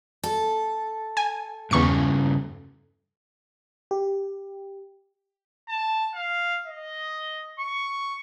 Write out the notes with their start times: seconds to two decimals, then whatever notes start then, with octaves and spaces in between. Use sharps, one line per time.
0.24 A4
1.17 G#5
1.71 E2 G2 C#3 A#5 C#6 C#7
3.91 G4
5.69 A5
6.14 F5
6.66 D#5
7.59 C#6